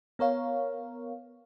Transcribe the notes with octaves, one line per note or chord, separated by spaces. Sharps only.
B3 A#4 C#5 F5